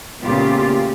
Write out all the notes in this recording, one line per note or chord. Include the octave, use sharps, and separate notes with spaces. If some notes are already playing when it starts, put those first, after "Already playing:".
A#2 C#3 A3 B3 F4 G4